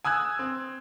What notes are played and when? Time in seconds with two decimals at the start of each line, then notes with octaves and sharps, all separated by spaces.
0.05 G#5 D#6 E6 F#6 G#6
0.39 C4